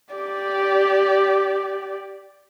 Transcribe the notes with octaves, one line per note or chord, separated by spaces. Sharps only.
G4 D5